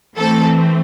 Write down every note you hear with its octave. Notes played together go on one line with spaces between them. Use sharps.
E3 A3 C4 A4